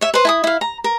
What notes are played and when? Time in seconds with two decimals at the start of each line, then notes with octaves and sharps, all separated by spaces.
0.01 C#5 E5
0.14 B4 C5
0.25 E4 A5 D#6
0.44 E4 F5
0.61 A#5
0.84 A#4